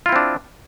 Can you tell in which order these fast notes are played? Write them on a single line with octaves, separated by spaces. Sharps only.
F4 E4 C4 D4